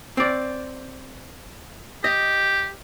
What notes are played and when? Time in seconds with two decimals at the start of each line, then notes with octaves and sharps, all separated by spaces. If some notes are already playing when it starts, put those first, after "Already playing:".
0.17 C4 D5
2.04 G4 D#5